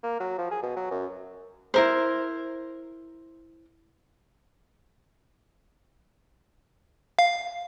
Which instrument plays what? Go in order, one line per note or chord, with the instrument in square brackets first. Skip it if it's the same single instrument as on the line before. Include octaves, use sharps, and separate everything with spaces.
[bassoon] A#3
F#3
F3
G#4
B2
F#3
F#2
[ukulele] E4 A#4 C5
[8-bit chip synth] F5